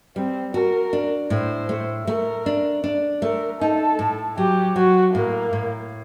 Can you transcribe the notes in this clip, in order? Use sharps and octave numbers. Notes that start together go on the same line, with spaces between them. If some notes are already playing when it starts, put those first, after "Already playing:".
G3 C4
F#4 A#4
D4
A2 C5
A3
A3 A#4
D4
D4
A3 A#4
D#4 A4
A2
F#3 G4
F#3 F#4
A2 A#3
A2